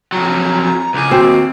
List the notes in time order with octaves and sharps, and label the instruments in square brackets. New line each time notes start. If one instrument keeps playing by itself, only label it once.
[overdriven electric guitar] F2 F#3 [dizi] A#5
[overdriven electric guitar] C#2 G#4 [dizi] D6
[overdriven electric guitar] D#2 [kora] C4 [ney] F#4